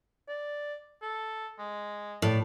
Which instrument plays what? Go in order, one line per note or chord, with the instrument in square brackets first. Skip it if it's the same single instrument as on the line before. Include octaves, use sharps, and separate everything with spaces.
[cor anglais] D5
A4
G#3
[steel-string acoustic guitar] A2 [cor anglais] D5